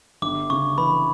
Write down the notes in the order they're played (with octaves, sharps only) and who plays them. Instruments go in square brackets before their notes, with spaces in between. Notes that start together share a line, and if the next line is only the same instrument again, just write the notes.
[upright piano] G1 [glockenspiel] D6
[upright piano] C#3 [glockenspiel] C#6
[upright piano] E3 [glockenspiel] B5